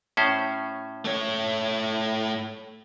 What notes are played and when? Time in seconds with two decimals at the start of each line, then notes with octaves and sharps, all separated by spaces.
0.17 A2 C#4 C5
1.05 A3 C#5